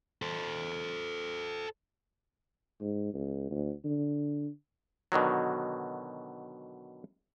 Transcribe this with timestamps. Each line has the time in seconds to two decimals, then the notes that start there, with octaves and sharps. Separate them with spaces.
0.22 A4 C5
2.81 G#2
3.14 C#2
3.51 D2
3.84 D3
5.12 B2 D3 D#3 F#3